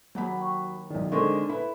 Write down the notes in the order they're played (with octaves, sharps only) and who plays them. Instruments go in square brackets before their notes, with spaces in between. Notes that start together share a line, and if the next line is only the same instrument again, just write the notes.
[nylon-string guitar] D#2 [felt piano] F#3 F#5 B5
[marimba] G5 C#6
[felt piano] B1 D#3 [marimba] D5
[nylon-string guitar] D3 G#3 D4 [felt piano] C4 D#4 A#4 [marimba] C6 C#6
[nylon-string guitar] E4 [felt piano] B4 B5